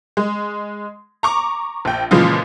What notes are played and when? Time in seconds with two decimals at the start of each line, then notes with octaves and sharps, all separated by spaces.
0.17 G#3
1.23 A#5 C#6 D6
1.85 A#1 G5
2.11 A#2 C#3 E3 F3 G#3 F4